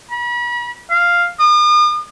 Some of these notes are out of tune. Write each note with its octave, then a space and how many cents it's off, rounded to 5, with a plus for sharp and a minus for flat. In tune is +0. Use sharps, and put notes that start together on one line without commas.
B5 -40
F5 +0
D#6 -45